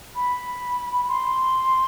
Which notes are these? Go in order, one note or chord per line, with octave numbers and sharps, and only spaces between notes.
B5
C6